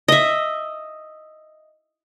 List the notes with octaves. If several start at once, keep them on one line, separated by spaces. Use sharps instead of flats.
D#5 E5